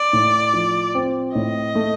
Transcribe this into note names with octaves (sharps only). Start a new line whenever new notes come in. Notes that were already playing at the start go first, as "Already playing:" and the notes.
Already playing: D5
A2
F3
C4
A2 D#5
A3